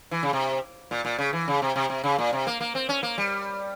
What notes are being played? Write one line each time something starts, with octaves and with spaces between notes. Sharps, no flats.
E3
C#3
C3
A#2
A#2
C#3
E3
C#3
C3
C3
C3
C#3
A#2
C3
A#3
A#3
C4
C#4
A#3
G3